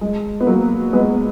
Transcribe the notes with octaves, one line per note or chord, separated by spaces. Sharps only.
G#3
B3
F#3 A#3
G#3 B3